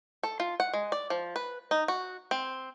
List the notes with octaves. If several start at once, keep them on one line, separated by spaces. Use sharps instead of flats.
A4
F4
F#5
G#3
D5
F3
B4
D#4
F#4
C4